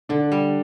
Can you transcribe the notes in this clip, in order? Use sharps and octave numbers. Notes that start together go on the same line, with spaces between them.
D3 D4
G3